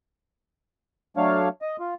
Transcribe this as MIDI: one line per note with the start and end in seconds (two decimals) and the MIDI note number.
1.17 1.48 54
1.17 1.48 57
1.17 1.48 62
1.17 1.48 73
1.17 1.48 77
1.62 1.76 75
1.79 1.94 65